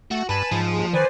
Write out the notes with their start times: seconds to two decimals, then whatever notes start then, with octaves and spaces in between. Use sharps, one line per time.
0.11 A3 F#4
0.29 G2 B4 G#5 A5 B5
0.52 G#2 F3
0.70 D#2 G#3
0.93 D#3 B4 C5 D5 G#5